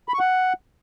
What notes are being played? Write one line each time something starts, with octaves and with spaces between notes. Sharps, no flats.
B5
C#6
F#5